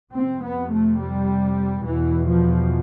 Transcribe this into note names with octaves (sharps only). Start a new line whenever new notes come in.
F2 C3 C4
B3
A3
G3
E2 B2 E3
F3